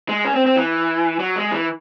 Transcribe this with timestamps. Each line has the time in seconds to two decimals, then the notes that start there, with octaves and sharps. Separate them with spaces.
0.09 G#3
0.25 C#4
0.35 C4
0.46 C4
0.56 E3
1.20 F#3
1.36 G#3
1.52 E3